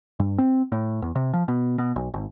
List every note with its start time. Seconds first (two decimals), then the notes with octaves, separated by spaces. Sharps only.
0.20 G2
0.38 C4
0.72 A2
1.02 E2
1.15 C3
1.34 F3
1.48 B2
1.78 B2
1.96 B1
2.14 G#1